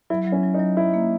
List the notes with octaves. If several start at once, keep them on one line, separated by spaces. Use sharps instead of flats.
F#3 E4
F#3
C#4
F#3
D#4
F#3
F#3 E4
A#3